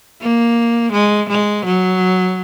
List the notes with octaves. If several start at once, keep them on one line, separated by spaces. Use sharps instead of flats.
A#3
G#3
G#3
F#3